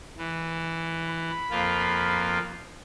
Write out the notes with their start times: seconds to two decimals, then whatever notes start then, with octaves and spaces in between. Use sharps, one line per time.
0.18 E3
1.09 B5
1.51 F2 A#3 F4